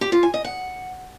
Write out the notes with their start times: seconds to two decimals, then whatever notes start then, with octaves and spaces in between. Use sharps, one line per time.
0.01 G4
0.12 F4
0.23 G#5
0.34 D#5
0.44 F#5